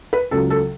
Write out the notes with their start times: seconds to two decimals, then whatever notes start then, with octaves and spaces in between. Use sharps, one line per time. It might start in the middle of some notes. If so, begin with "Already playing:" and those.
0.13 B4
0.31 C#2 C#3 F#3 A4
0.50 A4